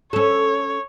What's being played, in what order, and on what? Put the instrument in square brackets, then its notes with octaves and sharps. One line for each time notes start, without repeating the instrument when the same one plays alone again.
[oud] C#4 A4 [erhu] C#5